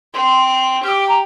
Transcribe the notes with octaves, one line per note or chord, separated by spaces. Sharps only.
C4 C6
G4 F6
D6
A#5